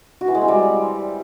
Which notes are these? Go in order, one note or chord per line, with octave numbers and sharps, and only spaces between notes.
F#4
E3
G#3
C4
G3